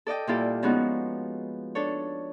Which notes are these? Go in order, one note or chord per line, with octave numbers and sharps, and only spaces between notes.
A4 D5 D#5 G5
A#2 G3 E4 F4 G4 A4
F3 G#3 B3 C#4 D#4 F#4
D4 A4 C#5